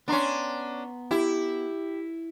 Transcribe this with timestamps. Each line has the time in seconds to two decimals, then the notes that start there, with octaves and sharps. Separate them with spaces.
0.08 B3 C#4 D4 A#5 C6
1.11 E4 G4